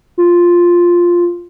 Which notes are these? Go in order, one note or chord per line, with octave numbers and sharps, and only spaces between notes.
F4